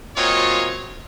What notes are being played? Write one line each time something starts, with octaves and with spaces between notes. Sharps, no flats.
A#2 F#3 C4 F4 C#5 D#5